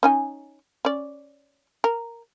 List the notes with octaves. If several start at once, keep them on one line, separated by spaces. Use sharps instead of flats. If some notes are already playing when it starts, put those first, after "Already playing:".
C#4 D#4 G#5
C#4 D5
A#4